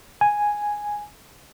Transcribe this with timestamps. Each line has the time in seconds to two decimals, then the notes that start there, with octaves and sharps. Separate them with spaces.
0.21 G#5